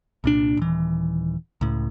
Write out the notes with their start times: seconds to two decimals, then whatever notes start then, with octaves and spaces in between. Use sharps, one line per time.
0.24 C2 A#2 D4
0.57 D#1 E3
1.61 C#2 A2